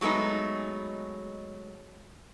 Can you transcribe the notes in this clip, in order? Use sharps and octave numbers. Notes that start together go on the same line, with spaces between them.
F#3 G#3 A3 B3 D#4